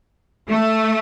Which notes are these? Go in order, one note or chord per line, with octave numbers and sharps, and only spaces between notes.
A3